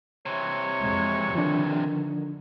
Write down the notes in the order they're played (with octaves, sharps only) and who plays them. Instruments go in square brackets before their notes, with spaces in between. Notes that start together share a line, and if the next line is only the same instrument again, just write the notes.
[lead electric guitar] C3 E3 [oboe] C#5
[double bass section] F2 G#3
[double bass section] D3 D#3 [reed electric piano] F3 D4